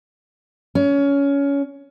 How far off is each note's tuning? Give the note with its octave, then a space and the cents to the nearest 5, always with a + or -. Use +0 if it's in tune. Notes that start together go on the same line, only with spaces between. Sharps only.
C#4 +20